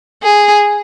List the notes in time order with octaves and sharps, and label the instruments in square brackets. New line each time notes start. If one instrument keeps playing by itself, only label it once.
[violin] G#4